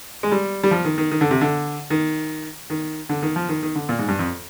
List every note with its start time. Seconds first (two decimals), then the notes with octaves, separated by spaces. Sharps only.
0.23 G#3
0.32 G3
0.63 G3
0.71 F3
0.85 D#3
0.98 D#3
1.11 D#3
1.21 D3
1.31 C3
1.41 D3
1.90 D#3
2.70 D#3
3.09 D3
3.22 D#3
3.36 F3
3.49 D#3
3.63 D#3
3.75 D3
3.89 A#2
3.99 G#2
4.08 G2
4.19 F2